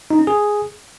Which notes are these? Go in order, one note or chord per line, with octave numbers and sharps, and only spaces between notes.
D#4
C#4
G#4